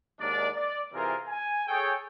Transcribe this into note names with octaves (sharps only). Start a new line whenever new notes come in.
D#2 G#2 D4 A#4 D5
D5
C3 E3 C4 F4 G#4 A#4
G#5
G#4 A4 C#5 G5